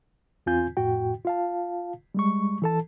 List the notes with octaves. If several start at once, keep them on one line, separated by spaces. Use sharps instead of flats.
E2 C4 F4 G#5 G6
F2 A2 F#4 G5
F4 F5 A5
G3 G#3 C#6
E3 A4 A5